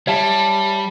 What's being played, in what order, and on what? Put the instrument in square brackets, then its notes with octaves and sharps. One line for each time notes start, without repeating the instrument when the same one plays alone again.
[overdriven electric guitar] G3 [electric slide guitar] C#5 E5 A5